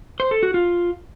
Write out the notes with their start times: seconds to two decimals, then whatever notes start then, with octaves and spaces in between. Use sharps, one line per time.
0.20 C5
0.31 A4
0.43 F#4
0.54 F4